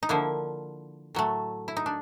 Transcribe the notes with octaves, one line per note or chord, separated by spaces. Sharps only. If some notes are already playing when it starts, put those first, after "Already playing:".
D#4
D3 F3 A#3 E4
A2 F#3 A3
E4
D#4
D4